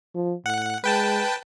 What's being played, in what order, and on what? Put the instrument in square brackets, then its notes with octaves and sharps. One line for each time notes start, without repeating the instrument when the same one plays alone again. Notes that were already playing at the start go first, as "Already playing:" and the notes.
[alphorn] F3
[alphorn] A2 [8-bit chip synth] F#5
[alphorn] G#3 [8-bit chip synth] B4 G5 A5